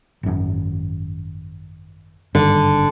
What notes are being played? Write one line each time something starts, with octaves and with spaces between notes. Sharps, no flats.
G#1 F#2
G#1 G2 D3 D#3